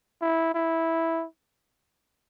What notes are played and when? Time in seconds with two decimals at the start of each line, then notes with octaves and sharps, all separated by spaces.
0.21 E4
0.55 E4